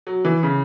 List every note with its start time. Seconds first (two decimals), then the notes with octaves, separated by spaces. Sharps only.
0.07 F#3
0.25 E3
0.43 C#3